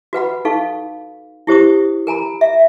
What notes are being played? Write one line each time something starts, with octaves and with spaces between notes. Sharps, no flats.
F#4 B4 F#5 B5
D#4 A4 F5 C#6
E4 G4 C5 C#6 D#6
A#4 G#5 A#5 B5
E5